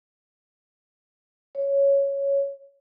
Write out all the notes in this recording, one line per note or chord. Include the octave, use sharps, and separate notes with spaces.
C#5